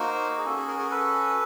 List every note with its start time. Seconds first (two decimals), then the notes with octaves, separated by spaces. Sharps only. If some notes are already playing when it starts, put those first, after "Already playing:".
Already playing: A#3 D#4 F#4 A#4 C5
0.38 G#4
0.45 C#4 A4
0.49 F#4
0.56 G#4
0.68 G#4 A#4
0.79 G#4 A#4
0.91 A4 B4